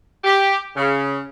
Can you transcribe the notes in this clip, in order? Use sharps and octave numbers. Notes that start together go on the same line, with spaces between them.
G4
C#3